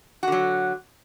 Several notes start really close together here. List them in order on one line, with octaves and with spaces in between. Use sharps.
F#4 D3 F#3